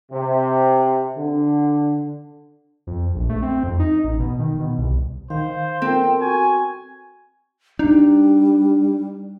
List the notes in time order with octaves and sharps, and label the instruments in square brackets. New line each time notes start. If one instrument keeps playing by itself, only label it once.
[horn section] C3
D3
[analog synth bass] F2
A#1
A3
C4
F2
D#4
A1
B2
D#3
B2
C2
[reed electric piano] D#3 [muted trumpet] C5 [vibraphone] F5
[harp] C4 [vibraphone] F4 G5 [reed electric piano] A4 A#4
[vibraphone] F#4 C#6 [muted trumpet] G#5
[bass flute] G3 [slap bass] D4 [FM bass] D#4